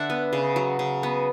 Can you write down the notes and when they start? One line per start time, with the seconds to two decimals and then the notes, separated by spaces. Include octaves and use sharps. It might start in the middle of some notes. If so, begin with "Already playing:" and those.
Already playing: D3 D4 D5 E5 F#5
0.10 B3
0.33 C#3
0.56 F#3
0.79 C#3
1.03 B3